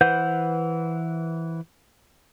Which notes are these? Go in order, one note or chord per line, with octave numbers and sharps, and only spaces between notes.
E3 B4 C5 F#5 G6